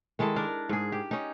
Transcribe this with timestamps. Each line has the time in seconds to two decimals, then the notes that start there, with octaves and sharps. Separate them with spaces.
0.19 D#3 G#3 E4 A4
0.36 D4 A#4
0.69 G#2 G#4
0.92 G4
1.11 C#4 D#4